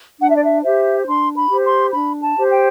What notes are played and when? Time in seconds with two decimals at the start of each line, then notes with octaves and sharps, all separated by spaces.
0.20 D4 F#5
0.28 E5
0.35 D5
0.44 E5
0.63 G4 C5 E5
1.07 D4 C6
1.36 B5
1.49 G4 C5
1.65 C6
1.92 D4 B5
2.22 A5
2.36 G4 C5
2.51 G5